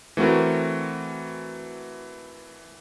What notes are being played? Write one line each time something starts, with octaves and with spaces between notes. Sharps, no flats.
E3 A3 C4 F#4 A#4